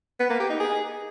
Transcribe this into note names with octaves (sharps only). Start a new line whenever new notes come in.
B3
A#3
G4
D#4
G#4